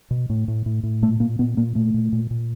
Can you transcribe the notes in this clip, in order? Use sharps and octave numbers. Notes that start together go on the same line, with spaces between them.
B2
A2
A2
A2
A2
A#2 A3
A#2 A#3
A#2 B3
A#2 A#3
A#2 A3
A#2
A#2
A#2